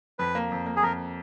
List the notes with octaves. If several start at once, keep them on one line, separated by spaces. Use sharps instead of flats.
F2 B4
A#3
F2
A#3
G#4
F2 A#4